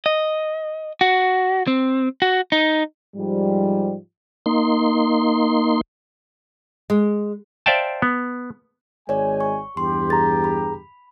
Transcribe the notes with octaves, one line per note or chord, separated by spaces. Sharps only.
D#5
F#4
C4
F#4
D#4
G#2 F3 G3
A#3 D#4 C6
G#3
C5 D5 E5 F5 G5 A5
B3
G#1 G#3 C#5 D5 G#5
C#6
E2 G2 G4 C6
G#4 A#5 A6
B5